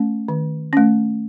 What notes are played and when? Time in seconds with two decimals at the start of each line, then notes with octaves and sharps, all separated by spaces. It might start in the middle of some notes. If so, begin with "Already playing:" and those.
Already playing: A3 C#4
0.28 D#3
0.73 A3 C#4